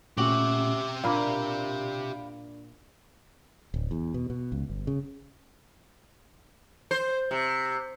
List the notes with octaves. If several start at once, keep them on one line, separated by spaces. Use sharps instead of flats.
A#2 A3 C#4 F#4 G4 E5 D6 F#7
A#2 A#3 D4 D5 F5 B5
D1
E2
B2
B2
C#2
G1
C#3
C5
C3